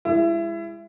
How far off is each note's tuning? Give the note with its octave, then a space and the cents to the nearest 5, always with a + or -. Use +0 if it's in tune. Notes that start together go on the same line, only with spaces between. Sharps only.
G#3 -25 E4 +25